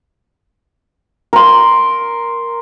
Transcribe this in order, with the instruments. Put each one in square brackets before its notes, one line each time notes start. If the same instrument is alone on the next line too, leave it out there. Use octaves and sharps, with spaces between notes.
[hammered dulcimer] A#4 C6